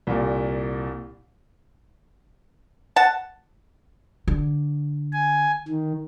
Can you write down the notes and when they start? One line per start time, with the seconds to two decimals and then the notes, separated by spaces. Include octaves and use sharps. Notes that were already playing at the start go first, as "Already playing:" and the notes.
0.07 C2 A#2
2.96 F#5 A5
4.28 D3
5.13 G#5
5.68 D#3